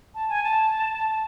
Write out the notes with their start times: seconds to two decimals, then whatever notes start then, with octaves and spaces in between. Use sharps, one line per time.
0.15 A5
0.29 G#5
0.44 A5